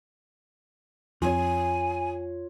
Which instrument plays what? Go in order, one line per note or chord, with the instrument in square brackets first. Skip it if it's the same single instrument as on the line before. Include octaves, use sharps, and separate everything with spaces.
[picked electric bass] F2 [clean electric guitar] F4 C#5 [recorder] G#5